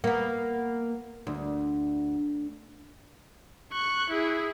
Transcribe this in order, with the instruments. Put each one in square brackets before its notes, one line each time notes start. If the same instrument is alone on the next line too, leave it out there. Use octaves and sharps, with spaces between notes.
[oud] A#3 B3
D2
[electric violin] C#6 F#6
E4 G#4